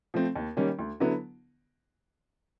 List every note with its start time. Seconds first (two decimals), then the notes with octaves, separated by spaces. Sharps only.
0.14 F3 A3 C4
0.36 D#2
0.57 D#3 G3 A#3 C#4
0.79 D2
1.00 D3 F#3 B3 E4